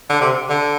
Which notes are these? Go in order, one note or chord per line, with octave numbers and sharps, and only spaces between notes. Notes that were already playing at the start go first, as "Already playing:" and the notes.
D3
C3
D3